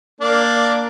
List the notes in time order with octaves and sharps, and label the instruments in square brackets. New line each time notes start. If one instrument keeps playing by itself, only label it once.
[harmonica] A#3 D4